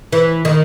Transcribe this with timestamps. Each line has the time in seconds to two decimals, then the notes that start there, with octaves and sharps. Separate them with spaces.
0.12 E3
0.45 D#3